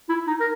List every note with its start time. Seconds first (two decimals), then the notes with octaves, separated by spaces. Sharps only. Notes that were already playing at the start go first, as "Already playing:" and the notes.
0.09 E4
0.27 D#4
0.40 A#4